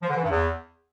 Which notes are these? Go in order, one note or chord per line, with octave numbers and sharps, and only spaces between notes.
F3
D3
E3
G2
E2